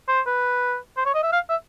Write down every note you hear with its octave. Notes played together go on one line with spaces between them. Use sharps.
C5
B4
C5
C#5
D#5
E5
F5
E5